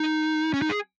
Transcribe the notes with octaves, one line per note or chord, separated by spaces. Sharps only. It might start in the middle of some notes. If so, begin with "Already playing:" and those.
Already playing: D#4
C#4
D#4
G#4